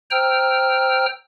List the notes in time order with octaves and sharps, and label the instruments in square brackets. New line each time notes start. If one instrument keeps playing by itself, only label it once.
[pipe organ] C5 G5 A#5 E6 F6